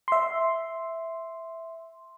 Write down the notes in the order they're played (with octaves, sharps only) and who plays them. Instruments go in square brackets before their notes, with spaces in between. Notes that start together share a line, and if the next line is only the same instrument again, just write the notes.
[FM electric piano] E5 C6